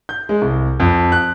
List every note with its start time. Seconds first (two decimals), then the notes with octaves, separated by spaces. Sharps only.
0.09 G6
0.29 G#3
0.41 C2
0.80 F2
1.12 F#6